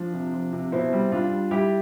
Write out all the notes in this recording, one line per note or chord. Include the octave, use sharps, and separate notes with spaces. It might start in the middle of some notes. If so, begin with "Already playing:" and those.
Already playing: F3 D4
C3
F3
C3
B2 C4 E4
G3
G3 D4 F4
G3
G3 E4 G4